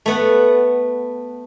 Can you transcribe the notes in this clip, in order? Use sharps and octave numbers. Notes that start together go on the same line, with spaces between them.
A3 B3 F#5